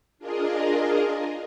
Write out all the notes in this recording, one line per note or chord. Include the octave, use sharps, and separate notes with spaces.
D4 F4 G#4 A#4 D#5